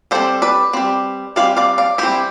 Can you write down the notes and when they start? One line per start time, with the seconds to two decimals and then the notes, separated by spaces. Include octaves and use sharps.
0.11 G3 C4 A4 C5
0.42 B4 D5
0.73 G3 C4
1.36 E3 G3 C4 D5 F5
1.57 D5 F5
1.78 D5 F5
1.98 E3 G3 C4 E4 G4